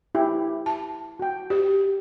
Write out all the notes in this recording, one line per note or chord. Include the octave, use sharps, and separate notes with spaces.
E4 G4
A5
F#4 G5
G4